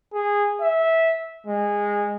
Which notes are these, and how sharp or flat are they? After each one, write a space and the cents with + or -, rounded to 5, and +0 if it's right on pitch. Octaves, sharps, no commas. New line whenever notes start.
G#4 -15
E5 -15
G#3 -20